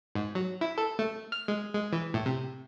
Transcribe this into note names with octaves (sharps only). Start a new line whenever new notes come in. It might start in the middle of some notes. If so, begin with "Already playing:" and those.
G#2
F#3
E4
A4
A3
F6
G#3
G#3
E3
A2
C3